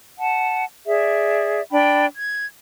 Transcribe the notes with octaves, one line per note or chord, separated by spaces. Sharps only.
F#5 A5
G#4 D5 E5
D4 G5 B5
G#6